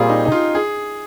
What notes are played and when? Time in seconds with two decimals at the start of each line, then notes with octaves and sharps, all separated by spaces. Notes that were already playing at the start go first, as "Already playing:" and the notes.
Already playing: A#2 G3 C4 F4 G4 G#4
0.09 D#4
0.25 D#4
0.32 F4
0.55 G#4